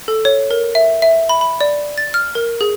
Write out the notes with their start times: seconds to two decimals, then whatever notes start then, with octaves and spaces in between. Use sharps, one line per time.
0.08 A4
0.25 C#5
0.51 A#4
0.75 E5
1.02 E5
1.29 B5
1.41 B5
1.61 D5
1.98 A6
2.14 F6
2.35 A#4
2.61 G#4